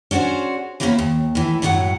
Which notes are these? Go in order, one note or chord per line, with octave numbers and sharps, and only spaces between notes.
C#4 D4 F#4 G#4 C5
E3 G3 A#3 B3 C#4 C5
D#2
A2 E3
F#2 A2 F#3 G#3 F4 F#5